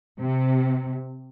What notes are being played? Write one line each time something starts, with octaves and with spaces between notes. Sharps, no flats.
C3